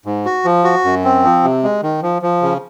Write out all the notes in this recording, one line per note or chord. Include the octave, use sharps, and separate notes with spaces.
G#2
F#4
F3
F#4
F#2
C4
F3
C3
G#3
D#3
F3
F3
C#3